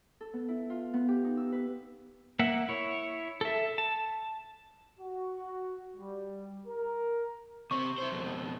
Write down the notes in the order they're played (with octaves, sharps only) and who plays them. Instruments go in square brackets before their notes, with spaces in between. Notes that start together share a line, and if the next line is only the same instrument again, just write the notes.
[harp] A4
B3
E4
F4
B3
G4
D#4
E6
B4
[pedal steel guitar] A#3 E5 F#5
E4 C#5
A4 E5
A5
[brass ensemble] F#4
G3
A#4
[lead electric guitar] C3 C4 [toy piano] C#6
[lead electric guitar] E4 C5
F2 B2